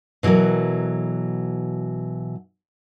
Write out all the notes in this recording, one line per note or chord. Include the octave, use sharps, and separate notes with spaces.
B2 E3 F#3 A4 A#4